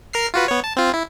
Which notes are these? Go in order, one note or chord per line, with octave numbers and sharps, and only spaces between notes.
A#4 F6 C7
F4 F#4 B4
B3 C#5
A5
C4 F4
E4